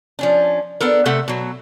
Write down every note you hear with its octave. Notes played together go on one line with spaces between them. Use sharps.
F3 C#4 D4
B3 D4 A4 A#4
C3 A3 A4 E5 F#5
B2 F#3